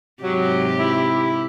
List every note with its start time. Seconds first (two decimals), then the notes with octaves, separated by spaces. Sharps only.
0.23 G#2 C3 F#3 G4
0.79 E4